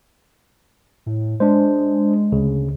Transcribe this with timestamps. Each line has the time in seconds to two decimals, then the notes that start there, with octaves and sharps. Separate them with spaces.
1.06 A2
1.40 G#3 D4 C5
2.32 D2 C#3